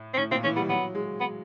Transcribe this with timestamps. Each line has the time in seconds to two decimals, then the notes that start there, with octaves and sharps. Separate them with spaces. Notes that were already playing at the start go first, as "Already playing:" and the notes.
Already playing: A2
0.14 C4
0.18 A2 C#4
0.31 A#2 C4
0.44 E3 C#4
0.56 G3 B3
0.69 F#3 B3
0.95 G#3
1.20 B3